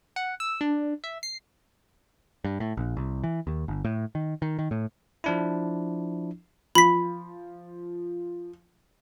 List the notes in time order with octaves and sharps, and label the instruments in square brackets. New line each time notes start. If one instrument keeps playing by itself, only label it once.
[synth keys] F#5
E6
D4
E5
C7
[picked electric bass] G2
A2
A#1
C2
E3
D#2
G1
A2
D#3
D#3
D#3
A2
[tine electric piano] F3 D4 E4
[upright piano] F3 [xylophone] B5 B6